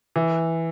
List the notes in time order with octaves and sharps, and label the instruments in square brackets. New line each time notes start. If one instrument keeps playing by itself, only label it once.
[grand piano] E3